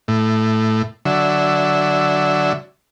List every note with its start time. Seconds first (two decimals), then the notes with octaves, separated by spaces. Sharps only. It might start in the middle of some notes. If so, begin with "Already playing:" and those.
0.08 A2
1.05 D3 F#3 E5